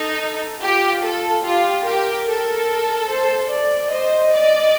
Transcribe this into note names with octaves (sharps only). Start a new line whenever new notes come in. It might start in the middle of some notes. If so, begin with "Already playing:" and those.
Already playing: D#4 A4
F4 G4
A4
F4 G4
G4 A#4
A4
C5
D5
C5 D#5
D5